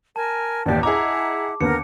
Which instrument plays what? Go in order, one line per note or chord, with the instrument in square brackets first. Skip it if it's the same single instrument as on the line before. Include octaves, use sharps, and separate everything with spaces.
[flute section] A#4 G#5 [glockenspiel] A5
[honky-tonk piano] A1 D#2 [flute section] G4 D5
[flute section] E4 F#5 [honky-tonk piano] G#4 D#5 A#5 [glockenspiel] D6
[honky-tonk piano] D#2 D3 B3 [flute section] A#4 [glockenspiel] C#7